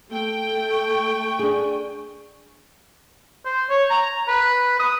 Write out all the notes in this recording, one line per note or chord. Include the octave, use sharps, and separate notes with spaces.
A3 G5
C#6
D4 G#4
C5
C#5
A#5
B4
D#6